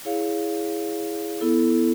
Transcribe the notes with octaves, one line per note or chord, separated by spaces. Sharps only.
E4 G#4 C#5 F5
B3 E4 A4